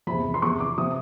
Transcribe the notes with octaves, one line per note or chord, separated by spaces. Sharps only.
E2 C3 F3 B5
C6
E2 C3 F3 C#6
D6
C3 F3 D#6